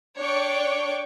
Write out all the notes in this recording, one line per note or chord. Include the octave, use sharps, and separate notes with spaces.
D4 C#5 D5 G5 C#6 D6